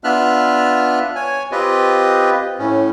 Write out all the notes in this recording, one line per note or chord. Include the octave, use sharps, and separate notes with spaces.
B3 D4 F4 E5 F6 F#6
C#5 G#5
C4 F4 G4 B4 D#5
A2 C#4